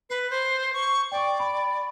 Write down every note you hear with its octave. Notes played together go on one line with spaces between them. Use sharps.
B4 C7
C5
C#6
D5 G5 C#6
B5